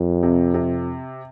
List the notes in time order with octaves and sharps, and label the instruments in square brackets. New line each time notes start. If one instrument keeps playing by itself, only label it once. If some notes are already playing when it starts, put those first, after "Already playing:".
Already playing: [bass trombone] F2
[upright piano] C3
C3